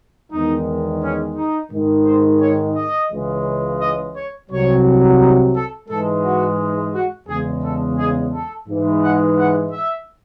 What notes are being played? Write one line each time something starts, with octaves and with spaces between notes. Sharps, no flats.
E2 D#3 G#3 D#4
C#4
D#4
G#2 D#3 G#3
C5
C#5
D#5
C#2 C#3 E3 G#3
D#5
C#5
C2 C3 F#3 C#5
D#4
A4
G#2 E3 G#3 A4
F#4
F#4
E2 C#3 G#3 G#4
A4
G#4
A4
G#2 E3 G#3
F#5
F#5
E5